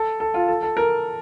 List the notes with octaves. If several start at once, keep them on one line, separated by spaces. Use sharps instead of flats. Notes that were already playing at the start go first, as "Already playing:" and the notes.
Already playing: A4
A4
F4
A4
A4
A#4